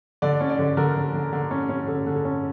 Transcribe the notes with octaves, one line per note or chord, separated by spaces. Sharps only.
D3 D5
C#4
D5
D3
D3 A#4
D3
D3
D3
C#4
C#4
D3 A4
D3
A4
C#4